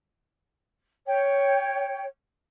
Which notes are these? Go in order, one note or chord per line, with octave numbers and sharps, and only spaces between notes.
C#5 G5